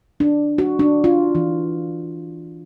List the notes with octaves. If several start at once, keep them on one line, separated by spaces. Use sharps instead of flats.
D4
F#4
D4
F4
E3